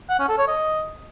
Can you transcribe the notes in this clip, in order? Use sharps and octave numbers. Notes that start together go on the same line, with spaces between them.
F#5
C#4
A4
C#5
D#5